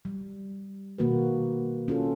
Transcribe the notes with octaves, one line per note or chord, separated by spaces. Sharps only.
G3
B2 D#3 A#3 F#4 A#4 B4
C#4 F4 A4